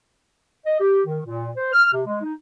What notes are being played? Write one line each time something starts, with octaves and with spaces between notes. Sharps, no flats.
D#5
G4
D#3
A#2
C5
F6
C3
G#3
D#4